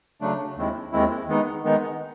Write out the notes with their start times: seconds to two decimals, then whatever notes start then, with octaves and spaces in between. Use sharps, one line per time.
0.21 C#3 F#3 A3 D4
0.56 D#2 D#3 G#3 C4 E4
0.92 D#2 D#3 G#3 C4 E4
1.27 D#3 G#3 B3 D#4
1.64 D#3 G#3 B3 D#4